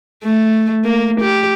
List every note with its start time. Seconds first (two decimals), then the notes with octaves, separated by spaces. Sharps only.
0.24 A3
0.84 A#3
1.21 G4